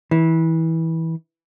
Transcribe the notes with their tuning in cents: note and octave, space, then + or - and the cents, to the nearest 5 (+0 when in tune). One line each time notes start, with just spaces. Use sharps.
E3 -20